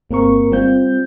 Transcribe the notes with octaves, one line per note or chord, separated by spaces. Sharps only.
G1 A#3 C4 A#4 C#6
G3 C4 F4 G6